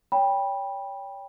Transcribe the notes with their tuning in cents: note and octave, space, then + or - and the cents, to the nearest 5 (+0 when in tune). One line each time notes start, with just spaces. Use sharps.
C#5 +30 G5 +15 B5 -20